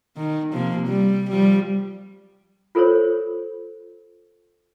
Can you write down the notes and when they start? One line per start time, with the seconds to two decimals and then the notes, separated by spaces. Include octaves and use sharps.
0.17 D#3
0.52 C3 F3 A#3
0.87 G3
1.30 F3 G3
2.75 F4 A4 A#4 C5 C#5